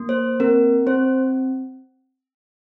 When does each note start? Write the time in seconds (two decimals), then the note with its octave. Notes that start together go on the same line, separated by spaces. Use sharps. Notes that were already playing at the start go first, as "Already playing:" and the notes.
Already playing: A#3
0.09 C5
0.40 C4 A#4
0.87 C4 C5